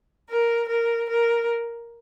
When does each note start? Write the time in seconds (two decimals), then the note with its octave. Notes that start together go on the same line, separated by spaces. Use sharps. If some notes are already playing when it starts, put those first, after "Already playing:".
0.29 A#4
0.69 A#4
1.10 A#4